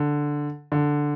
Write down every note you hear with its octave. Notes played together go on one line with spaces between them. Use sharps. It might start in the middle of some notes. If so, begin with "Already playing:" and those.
Already playing: D3
D3